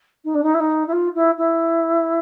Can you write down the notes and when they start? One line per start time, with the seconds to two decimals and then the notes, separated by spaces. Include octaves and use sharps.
0.25 D#4
0.35 D4
0.43 D#4
0.54 E4
0.60 D#4
0.88 E4
0.93 F4
1.15 E4
1.38 E4